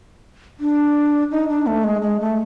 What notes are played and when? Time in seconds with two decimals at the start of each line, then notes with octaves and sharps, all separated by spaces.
0.60 D4
1.31 D#4
1.49 D4
1.67 A3
1.84 G#3
2.02 G#3
2.20 A3